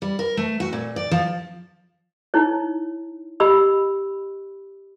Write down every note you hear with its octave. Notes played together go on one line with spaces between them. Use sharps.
G3
A#4
A3
F#4
A#2
D5
F3
D#4 E4 C#5
G4 D#5 B5 E6